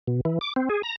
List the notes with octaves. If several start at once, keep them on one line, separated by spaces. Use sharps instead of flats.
B2
E3
D6
C4
G#4
A#5